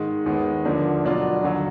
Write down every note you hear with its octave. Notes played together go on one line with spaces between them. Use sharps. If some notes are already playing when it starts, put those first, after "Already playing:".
Already playing: G#2 D#3 G#3
D#2 D#3 G#3 B3
D2 D3 F3 A#3 D4
B2 F#3 D4 F4
D#2 D3 F#3